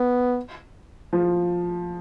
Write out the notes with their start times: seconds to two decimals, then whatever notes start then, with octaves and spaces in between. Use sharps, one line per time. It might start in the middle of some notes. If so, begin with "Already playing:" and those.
Already playing: B3
1.13 F3